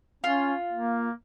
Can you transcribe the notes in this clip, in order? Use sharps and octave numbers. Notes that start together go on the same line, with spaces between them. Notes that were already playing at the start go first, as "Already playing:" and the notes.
C#4 F4
A#3